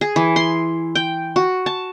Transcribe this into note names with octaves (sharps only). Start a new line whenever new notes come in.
G#4
E3
C6
G5
F#4
A5